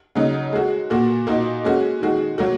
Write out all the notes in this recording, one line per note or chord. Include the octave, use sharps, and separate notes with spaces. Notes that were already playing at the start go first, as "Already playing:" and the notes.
C#3 F#3 D#4
G#3 F#4
A#2 A#3 F#4
A#2 A#3 D#4 F#4
G#3 C#4 F#4
D#3 G#3 F#4
F#3 A#3 F#4